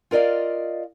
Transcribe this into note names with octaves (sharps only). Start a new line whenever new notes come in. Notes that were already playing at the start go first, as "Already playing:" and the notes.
F4 A#4 D5 D#5 F5